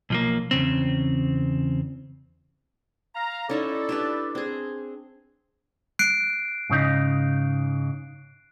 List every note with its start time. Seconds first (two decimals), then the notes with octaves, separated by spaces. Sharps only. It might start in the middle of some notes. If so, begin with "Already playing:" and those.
0.10 B1 F3 A#3
0.51 E2 C#3 C4
3.15 F5 A#5
3.49 C#4 D#4 E4 A4 D5 E5
3.89 D4 G4 B4
4.35 C4 G#4
5.99 F#6 C7 D7
6.70 G#2 C#3 D#4